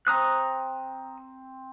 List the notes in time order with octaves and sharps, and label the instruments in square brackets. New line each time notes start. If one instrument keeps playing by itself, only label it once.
[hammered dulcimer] C4 [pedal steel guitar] A#5 D#6 F#6